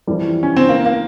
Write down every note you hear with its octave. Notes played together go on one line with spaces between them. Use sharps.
F2 E3 G3
C#4
C4
A#3
A#3